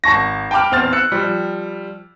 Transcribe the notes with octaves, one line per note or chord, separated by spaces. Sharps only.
G#1 A5 C#6 A#6
G5 A5 B5 D6 F6
E2 C4 F6 A6
E6 F#6 C#7
F3 G3